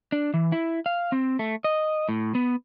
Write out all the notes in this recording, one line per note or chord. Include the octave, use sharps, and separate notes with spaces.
D4
E3
E4
F5
C4
A3
D#5
A2
B3